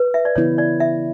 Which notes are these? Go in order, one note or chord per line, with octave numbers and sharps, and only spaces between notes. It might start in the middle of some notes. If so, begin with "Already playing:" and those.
Already playing: B4
E5
D5
C#3 E3 B3 E4 C#5
D5
E5